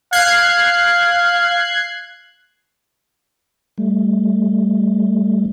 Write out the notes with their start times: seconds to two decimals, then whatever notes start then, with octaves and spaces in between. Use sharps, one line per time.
0.13 F5 F#6 G#6 C7
3.78 G3 A3